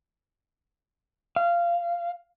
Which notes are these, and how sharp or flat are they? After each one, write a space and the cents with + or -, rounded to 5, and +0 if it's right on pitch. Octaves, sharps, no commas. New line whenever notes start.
F5 -15